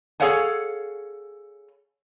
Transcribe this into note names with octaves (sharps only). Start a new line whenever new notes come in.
G#4 A4 C#5 F5 F#5 G#5